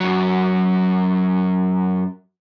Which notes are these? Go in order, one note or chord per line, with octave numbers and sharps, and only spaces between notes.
F#2 F#3